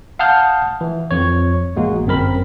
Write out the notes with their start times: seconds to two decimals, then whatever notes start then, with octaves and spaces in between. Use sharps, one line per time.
0.19 F5 F#5 A5 D#6 F6 G6
0.81 E3
1.11 F2 C#5
1.76 A1 G#3 A#3 F#4
2.06 G1 F#2 C4 A#4 B5